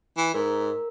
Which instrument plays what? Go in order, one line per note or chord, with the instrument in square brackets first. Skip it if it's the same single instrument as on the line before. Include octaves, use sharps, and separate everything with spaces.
[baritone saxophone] E3
[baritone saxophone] G#2 [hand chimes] A#4